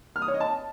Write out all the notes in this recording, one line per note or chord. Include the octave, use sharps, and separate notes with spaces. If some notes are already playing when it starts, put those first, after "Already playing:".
F6
D#6
C#5
D#5
A5